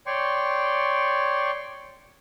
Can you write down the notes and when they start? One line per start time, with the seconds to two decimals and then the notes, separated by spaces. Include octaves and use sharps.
0.07 C#5 D5 G5 C6 C#6